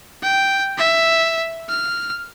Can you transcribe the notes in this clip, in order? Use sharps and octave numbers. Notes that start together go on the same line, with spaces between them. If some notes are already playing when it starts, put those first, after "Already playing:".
G5
E5
F6